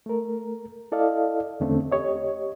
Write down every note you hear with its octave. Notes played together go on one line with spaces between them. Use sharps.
A3 A#4
E4 A4 D5 D#5 F5
E2 D3 A3 C4 C#4
G4 C#5 D#5